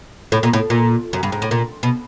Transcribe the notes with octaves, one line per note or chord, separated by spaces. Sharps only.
A2
A#2
A2
A#2
F#2
G2
G#2
A2
A#2
B2